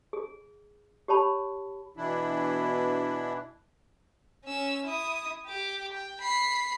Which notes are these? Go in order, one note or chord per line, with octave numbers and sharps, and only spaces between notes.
G#4
G4 C#5 A5 B5
B2 E3 D4 E4
C#4 E6
E4 D#6
G4 D6
G5
B5 C7